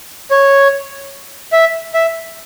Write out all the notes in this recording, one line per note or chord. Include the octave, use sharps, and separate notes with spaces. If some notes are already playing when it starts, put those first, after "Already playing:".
C#5
E5
E5